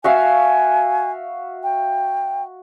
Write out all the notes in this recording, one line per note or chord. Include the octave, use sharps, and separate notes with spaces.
F#4 E5 F5 G#5
G5